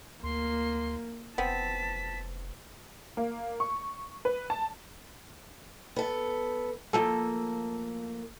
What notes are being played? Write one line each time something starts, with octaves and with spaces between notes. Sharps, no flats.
D2 A#3 C6
F1 B3 C4 A5 B6
A#3
C#6
B4
A5
B3 A4
F3 A3 A#3 A4